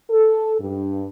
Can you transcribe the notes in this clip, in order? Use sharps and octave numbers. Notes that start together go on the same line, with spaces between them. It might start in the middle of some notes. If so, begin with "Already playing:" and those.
A4
G2